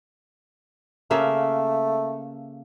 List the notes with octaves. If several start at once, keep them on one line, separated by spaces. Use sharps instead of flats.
C#3 A3 A#3 E5